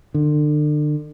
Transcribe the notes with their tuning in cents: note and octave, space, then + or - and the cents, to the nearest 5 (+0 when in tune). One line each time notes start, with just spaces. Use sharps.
D3 +35